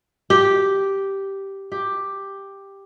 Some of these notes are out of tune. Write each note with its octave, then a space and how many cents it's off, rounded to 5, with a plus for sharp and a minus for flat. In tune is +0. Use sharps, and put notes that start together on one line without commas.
G4 -5
G4 +5